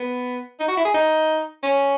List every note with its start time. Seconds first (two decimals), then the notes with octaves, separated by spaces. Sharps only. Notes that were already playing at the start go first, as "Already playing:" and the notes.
Already playing: B3
0.60 D#4
0.68 F#4
0.77 E4
0.85 G#4
0.94 D#4
1.63 C#4